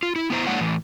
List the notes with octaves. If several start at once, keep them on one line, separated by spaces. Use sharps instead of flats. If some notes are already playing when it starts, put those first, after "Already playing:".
F4
E4
B3 E4 C5 A#5
G#3 A#3 D4 E4 C#5 F#5
A2 E3